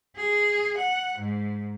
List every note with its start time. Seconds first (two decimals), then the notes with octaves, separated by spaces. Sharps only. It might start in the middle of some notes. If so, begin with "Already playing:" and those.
0.16 G#4
0.78 F#5
1.19 G#2